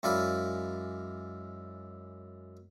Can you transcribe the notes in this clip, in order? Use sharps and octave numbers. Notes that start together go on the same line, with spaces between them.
F#2 G#3 E4 D5 F5 B5